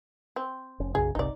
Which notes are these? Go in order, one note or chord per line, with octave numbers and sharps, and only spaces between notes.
C4
F1 C#4
B1 F#2 C#3 G#4
G1 C2 C3 D#4 D5